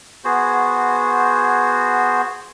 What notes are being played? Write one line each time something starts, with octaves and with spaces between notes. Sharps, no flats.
B3 F#4 G#4 C5